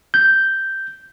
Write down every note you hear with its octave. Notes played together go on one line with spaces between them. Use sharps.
G6